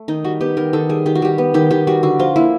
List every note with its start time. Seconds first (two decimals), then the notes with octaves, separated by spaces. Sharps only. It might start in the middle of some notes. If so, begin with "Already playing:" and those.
Already playing: A3
0.08 D#3 D#4
0.24 G3 F#4
0.41 B3 G4
0.57 D#3 A#4
0.73 D#3 A4
0.89 G3 G#4
1.06 D#3 G4
1.15 F#4
1.22 G3 G4
1.38 B3
1.54 D#3 G4
1.71 D#3 G4
1.87 G3 F#4
2.03 D3 F#4
2.19 F3 F4
2.36 A#3 E4